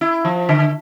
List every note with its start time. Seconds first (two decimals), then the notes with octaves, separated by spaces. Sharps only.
0.01 E4
0.25 F3
0.49 D3